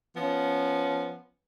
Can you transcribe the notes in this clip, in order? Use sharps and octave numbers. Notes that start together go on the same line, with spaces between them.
F3 B3 C#4